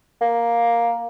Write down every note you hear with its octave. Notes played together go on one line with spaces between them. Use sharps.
A#3